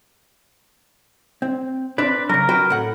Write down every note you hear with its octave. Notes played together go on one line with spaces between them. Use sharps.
C4
C4 D4 B4 D5
C#3 F#3 A#4
F#4 B4 G5
A2 F#5